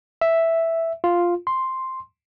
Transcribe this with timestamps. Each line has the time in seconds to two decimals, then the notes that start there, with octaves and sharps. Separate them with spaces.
0.21 E5
1.04 F4
1.47 C6